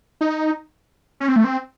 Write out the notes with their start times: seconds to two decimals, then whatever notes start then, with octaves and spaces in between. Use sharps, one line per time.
0.21 D#4
1.20 C#4
1.28 C4
1.36 A3
1.44 C4